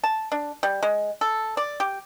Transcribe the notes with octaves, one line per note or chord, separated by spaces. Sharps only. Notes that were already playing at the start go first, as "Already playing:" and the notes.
A5
D4
G3
G#3
A4
D5
G4